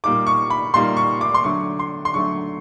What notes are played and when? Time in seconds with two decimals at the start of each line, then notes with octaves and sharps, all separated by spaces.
0.04 A#2 G3 A#3 D#4 D6
0.27 C#6
0.50 B5
0.74 A#2 G3 A#3 D#4 C6
0.97 C#6
1.21 D6
1.34 C6
1.44 D3 F#3 A3 D4 C#6
1.79 C6
2.05 C6
2.14 D3 F#3 A3 D4 C#6